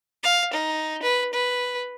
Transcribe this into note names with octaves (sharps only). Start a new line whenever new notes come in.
F5
D#4
B4
B4